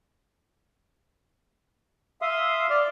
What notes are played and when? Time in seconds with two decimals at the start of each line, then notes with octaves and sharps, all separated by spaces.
2.22 E5 F5 C6 D#6
2.70 D5 D6 F6